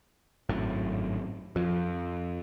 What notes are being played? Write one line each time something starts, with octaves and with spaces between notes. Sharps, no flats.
G#1 F#2 A2
F2 F3